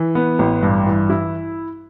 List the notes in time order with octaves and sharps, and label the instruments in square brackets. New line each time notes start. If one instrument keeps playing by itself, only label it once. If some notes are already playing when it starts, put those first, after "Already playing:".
Already playing: [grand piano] E3
B3
A1
G2
E3
E4